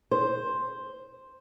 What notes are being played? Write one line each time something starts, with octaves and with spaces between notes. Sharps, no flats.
C5